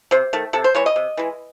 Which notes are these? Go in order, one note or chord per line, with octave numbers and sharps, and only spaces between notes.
C3 C5
D#3 A3
C3 A4
C5
E3 G#3 C#5
D#5
C3
E3 G#3